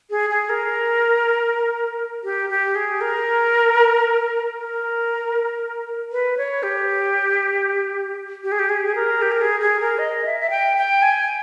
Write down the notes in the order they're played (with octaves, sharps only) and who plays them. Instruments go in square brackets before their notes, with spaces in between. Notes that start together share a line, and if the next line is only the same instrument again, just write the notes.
[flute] G#4
G#4
A#4
G4
G4
G#4
A#4
A#4
B4
C#5
G4
G4
G#4
G4
G#4
G#4
A#4
G4
A#4
G#4
G#4
A#4
D#5
E5
E5
G5
G5
G#5